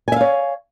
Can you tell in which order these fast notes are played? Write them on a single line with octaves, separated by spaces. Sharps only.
G#5 E5 F5 C#5